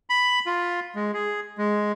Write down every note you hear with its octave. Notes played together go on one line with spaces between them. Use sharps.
B5
F4
G#3
G#4
G#3